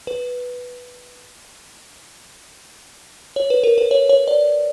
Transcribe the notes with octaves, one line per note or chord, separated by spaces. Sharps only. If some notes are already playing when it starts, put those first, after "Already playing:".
B4
C#5
B4
A#4
B4
C#5
C#5
D5